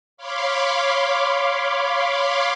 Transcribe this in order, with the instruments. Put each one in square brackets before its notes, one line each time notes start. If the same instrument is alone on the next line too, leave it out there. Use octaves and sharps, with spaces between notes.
[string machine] C#5 F5 B5 C6 D6